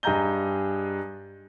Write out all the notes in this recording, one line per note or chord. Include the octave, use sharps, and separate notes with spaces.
G2 G#4 D#5 A#5 G6 G7